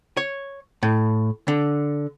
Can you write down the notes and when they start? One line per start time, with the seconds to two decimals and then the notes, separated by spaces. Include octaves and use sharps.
0.17 C#5
0.83 A2
1.48 D3